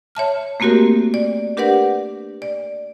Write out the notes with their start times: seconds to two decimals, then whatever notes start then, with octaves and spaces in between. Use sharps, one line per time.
0.15 C#5 E5 A5 F6
0.60 A3 A#3 C4 F#4 G4 A#4
1.14 D5
1.57 D4 G4 A#4 B4 D5 F#5
2.42 D5